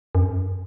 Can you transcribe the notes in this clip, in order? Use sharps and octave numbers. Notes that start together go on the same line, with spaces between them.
F#2